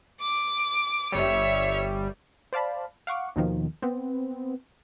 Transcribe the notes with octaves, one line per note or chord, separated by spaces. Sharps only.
D6
G1 G3 C#5 E5
C5 D5 F5 A5 B5
F5 F#5 C#6 D6
D#2 B2 D#3 F3
B3 C4